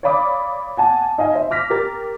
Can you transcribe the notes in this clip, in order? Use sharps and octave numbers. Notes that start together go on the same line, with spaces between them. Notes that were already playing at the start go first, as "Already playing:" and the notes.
C#5 D5 F5 B5 D6 D#6
F#5 G#5 A5
D#4 D#5 F5 G#5
C5 E5
D6 F6 A#6 B6
G4 A#4 A6